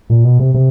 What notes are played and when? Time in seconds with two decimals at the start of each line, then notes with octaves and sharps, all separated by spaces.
0.10 A#2
0.24 B2
0.39 C3
0.54 C3